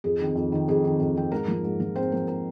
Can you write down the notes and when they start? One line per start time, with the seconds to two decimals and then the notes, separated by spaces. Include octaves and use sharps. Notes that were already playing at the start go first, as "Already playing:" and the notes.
0.04 F2 G#4
0.20 D#3 C4
0.36 F2
0.52 D#3 C4
0.68 F2 G#4
0.84 D#3 C4
1.00 F2
1.16 D#3 C4
1.32 G#2 A#4
1.48 F3 A#3
1.64 G#2
1.80 F3 A#3
1.95 G#2 C4 C5
2.12 F3 A#3 A#4
2.28 A#4